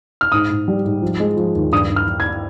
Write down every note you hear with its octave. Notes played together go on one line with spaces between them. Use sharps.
F6
G#2 D#6
G#2
G3
G#2
F3
G#3
F3
D#2
G2 D#6
G2
F6
G2
G#6